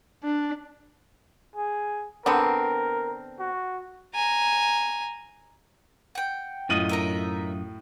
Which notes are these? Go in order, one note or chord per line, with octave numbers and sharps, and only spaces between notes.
D4
G#4
D3 B3 C4 A#4
F#4
G#5 A#5
F#5 G5
F#2 A2 F4 D#5 D#7 F#7
D#4 A#4 E5